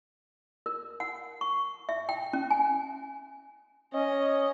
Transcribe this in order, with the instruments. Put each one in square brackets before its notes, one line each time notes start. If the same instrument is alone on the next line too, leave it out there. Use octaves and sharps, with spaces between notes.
[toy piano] A#4
F#5
C#6
E5
G5
C#4
G#5
[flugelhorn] C#4 [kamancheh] D#5